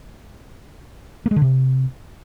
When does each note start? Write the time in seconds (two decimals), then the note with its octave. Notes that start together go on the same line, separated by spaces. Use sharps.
1.26 A#3
1.31 G#3
1.36 D3
1.42 C3